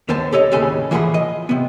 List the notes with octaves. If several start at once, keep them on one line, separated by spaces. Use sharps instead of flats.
D#2 D3 B3 C5 A5
G4 A4 C#5 D#5
D#2 A2 C#3 A4 G#5 B5
E3 F3 G#4 F#5 B5
D#5
C3 B3